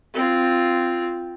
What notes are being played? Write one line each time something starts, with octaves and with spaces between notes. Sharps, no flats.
C4 F4